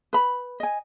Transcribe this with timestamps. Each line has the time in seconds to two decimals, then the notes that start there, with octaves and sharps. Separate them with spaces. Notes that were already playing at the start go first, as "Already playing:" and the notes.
0.13 B4 B5
0.60 D#5 G#5